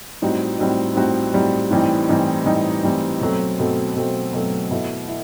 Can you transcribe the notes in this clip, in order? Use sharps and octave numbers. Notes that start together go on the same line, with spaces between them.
A2 G3 C4 D#4 F#4
A2 G3 C4 D#4 F#4
A2 G3 C4 D#4 F#4
A2 G3 C4 D#4 F#4
A2 E3 G3 C4 D#4
A2 E3 G3 C4 D#4
A2 E3 G3 C4 D#4
A2 E3 G3 C4 D#4
B2 F#3 A3 C4
B2 F#3 A3 C4
B2 F#3 A3 C4
B2 F#3 A3 C4
B2 A3 E4
E4